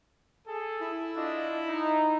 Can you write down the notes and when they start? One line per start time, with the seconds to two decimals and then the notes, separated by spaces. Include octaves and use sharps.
0.46 G#4 A4
0.81 E4
1.15 D4 F4 D#5
1.68 D#4